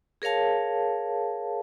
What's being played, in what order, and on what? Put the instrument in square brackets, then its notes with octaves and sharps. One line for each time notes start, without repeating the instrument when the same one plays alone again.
[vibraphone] G#4 A#4 C#5 F5 A5